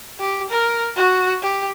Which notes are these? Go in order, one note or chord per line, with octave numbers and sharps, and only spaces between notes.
G4
A#4
F#4
G4